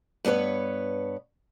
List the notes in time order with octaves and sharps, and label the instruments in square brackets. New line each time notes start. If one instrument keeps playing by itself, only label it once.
[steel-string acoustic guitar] G2 B3 G#4 B4 C#5